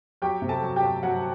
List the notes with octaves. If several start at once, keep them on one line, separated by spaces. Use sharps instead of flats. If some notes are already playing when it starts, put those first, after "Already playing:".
F#3 G4 G5
C3
A4 A5
F#3
G4 G5
F#3
F#3 F#4 F#5